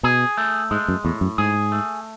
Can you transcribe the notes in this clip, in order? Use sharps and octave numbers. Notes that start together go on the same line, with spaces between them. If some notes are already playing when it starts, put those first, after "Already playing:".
B2 G#4
A3
G#2 G#3
F#2
E2 A2
F#2
G#2 G#4
A3